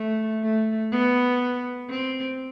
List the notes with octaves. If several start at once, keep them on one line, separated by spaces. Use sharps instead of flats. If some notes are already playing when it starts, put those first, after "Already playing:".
Already playing: A3
A3
B3
C4